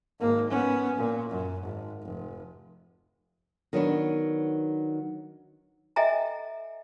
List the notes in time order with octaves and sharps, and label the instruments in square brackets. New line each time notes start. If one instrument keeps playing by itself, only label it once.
[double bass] G#1 A#3
B3 C#4
A#2
F#2
G#1
F1
[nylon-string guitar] D#3 F#3 B3 D4
[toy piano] A4 D#5 E5 G5 G#5 A#5